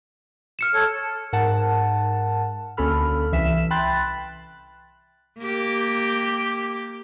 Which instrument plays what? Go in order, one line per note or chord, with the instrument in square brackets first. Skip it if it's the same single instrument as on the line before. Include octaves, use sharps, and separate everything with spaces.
[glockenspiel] F6 C#7 E7
[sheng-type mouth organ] A4 C#5
[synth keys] G#2 A#4 F#5 A5
D2 A#3 C#4 A4 B5 F6
C2 E3 E5 B6 E7
G5 B5 C6 F#6 A6
[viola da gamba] A#3 G4